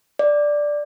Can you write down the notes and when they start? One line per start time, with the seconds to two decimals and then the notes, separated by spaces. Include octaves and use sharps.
0.19 D5